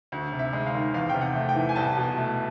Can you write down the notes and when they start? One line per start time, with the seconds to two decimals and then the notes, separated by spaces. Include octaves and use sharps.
0.12 D2
0.32 C3
0.39 E5
0.53 G#3
0.66 F5
0.74 D#3
0.94 E2 F5
1.10 C3 G5
1.21 F#5
1.35 A3
1.49 G5
1.55 E3
1.69 G#5
1.76 C2 A5
1.97 B2
2.18 A3